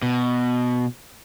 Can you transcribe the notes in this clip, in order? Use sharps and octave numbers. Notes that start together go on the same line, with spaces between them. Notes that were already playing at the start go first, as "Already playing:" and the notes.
B2